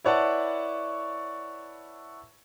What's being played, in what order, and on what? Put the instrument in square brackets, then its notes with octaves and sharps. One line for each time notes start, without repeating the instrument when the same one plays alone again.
[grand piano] E4 B4 C#5 D5 F#5 A5